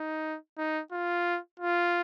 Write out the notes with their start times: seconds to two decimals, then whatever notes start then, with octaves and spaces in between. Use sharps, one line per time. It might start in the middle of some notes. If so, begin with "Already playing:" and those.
Already playing: D#4
0.58 D#4
0.92 F4
1.60 F4